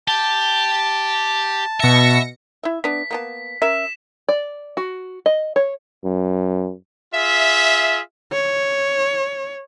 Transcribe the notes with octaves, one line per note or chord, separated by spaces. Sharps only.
G4 A5
B2 E5 A#6 C#7
E4 E5
B3 D4 B6
A#3 B3 A5
C#4 A#4 E5 B6 E7
D5
F#4
D#5
C#5
F#2
F4 G#4 E5
C#5